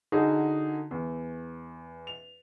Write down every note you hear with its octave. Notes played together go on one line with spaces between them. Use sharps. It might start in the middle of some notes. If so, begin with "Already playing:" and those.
D3 D#4 F#4 G#4
E2
F7